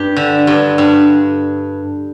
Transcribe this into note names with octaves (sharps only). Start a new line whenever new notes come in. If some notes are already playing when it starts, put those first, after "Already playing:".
Already playing: G2 G4
D3
G2
G2